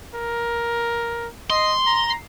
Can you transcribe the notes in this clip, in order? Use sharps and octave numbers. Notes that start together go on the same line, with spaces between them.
A#4
D#5 C6
A#5